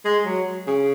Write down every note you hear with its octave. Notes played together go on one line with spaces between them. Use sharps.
G#3
F#3
C#3